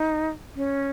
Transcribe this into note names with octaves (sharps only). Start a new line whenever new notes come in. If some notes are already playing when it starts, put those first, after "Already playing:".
Already playing: D#4
C#4